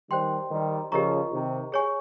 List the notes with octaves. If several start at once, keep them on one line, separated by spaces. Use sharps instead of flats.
D#3 G3 C5 G5 C6
D#3 G3
C#3 F3 G4 A#4 D#5 A#5 C#6
C3 D#3
G#4 C#5 G#5 C#6